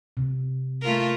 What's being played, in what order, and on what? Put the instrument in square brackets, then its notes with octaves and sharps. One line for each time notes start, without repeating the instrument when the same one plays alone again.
[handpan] C3
[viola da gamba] A3 F4 A#4